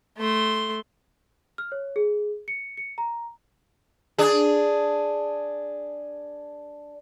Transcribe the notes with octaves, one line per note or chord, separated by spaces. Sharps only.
A3 C6
F6
C#5
G#4
C#7
C#7
A#5
D4 G#4